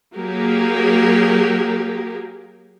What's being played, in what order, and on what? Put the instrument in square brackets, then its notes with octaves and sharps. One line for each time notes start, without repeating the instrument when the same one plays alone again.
[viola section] F#3 A#3 G4 G#4 A#4